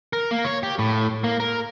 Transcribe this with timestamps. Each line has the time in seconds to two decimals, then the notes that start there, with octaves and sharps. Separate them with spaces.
0.13 A#4
0.31 A#3
0.45 C#5
0.63 G4
0.79 A2
1.24 A#3
1.40 A#4